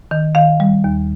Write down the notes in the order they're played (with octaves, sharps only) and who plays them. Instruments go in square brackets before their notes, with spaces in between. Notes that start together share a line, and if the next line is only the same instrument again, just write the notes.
[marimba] D#3
D#3 F5
G3
D#2